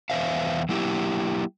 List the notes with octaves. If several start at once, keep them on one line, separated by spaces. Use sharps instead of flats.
E2 D#3 B4 C5 E5 F5
F#3 A#3 E4 G4